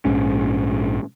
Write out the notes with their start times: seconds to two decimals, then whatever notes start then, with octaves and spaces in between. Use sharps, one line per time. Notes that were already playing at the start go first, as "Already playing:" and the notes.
0.05 A#1 G#2 C#4